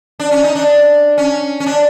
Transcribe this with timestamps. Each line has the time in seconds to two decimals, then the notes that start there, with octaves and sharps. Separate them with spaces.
0.20 D4
0.31 C#4
0.43 D#4
0.55 D4
1.18 C#4
1.60 C#4
1.66 D4